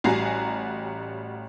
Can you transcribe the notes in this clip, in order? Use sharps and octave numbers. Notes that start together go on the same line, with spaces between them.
A1 G3 F#4 G#5 A#5 C7